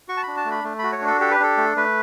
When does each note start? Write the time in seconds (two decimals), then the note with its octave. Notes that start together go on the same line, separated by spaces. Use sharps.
0.08 F#4 C#6
0.17 A5
0.23 D4 B5
0.37 A5
0.45 A3
0.51 B5
0.64 A3
0.79 F#4 B5
0.92 C#5
1.02 D4
1.07 A4
1.20 G4 A4
1.31 B4
1.40 D4 A4
1.57 A3
1.76 A3 B4